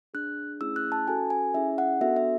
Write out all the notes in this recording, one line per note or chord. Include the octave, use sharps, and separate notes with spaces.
D4 G#4 F#6
A3 C#4 E4 G#4 E6
F#6
A5
C#4 F#4 A4 G#5
G#5
C#4 E4 G#4 E5
F#5
B3 D4 F#4 A4 E5
E5